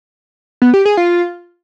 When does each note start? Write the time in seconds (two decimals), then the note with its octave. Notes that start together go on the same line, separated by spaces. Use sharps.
0.62 B3
0.74 G4
0.85 G#4
0.97 F4